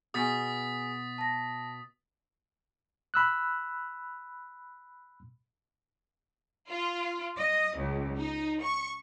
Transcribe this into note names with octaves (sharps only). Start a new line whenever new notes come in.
B2 G#4 G#5 D#6 A6 B6
A5 A#6
B5 E6 F#6
F4
D#5
C#2
D#4
C#6